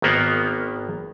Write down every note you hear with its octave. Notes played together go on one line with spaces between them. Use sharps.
G#1 D#3 A#3 B3